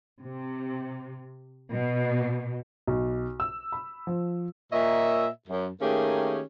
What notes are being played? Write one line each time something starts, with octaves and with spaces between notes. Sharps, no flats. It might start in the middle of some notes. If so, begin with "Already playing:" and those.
C3
B2
B1
E6
B5
F3
A#2 A#4 C#5 D#5 E5
F#2
D#3 A3 A#3 C#4 G4 G#4